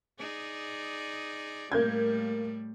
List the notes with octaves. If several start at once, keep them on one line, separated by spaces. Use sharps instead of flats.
D#4 G#4 D5
A2 G3 A3 A#3 G6 G#6